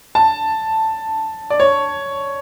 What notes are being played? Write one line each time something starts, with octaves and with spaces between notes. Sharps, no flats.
A5
D5
C#5